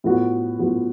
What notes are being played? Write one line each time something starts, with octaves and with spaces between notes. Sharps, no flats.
A2 F3 B3 F#4
A2 F3 B3 F#4